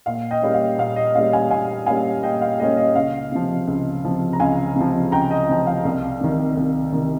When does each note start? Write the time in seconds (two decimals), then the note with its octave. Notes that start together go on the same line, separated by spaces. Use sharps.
0.06 A#2 F5
0.31 D#5 G5
0.42 G3 A#3 C#4
0.54 F5
0.78 A#2 F5
0.96 D#5
1.15 G3 A#3 C#4 F5
1.33 F5 G#5
1.50 A#2 F5 G#5
1.86 G3 A#3 C#4 F5 G#5
2.23 A#2 D#5 G5
2.41 F5
2.60 G3 A#3 C#4 D#5
2.77 D#5
2.95 C#2 F5
3.32 C3 F3
3.68 C#2
4.04 C3 F3
4.33 A#5
4.40 C#2 F5 G#5
4.76 C3 F3
5.12 C#2 G5 A#5
5.31 D#5 G5
5.49 C3 F3
5.67 F5
5.85 C2
6.21 C3 D#3
6.57 C2
6.92 C3 D#3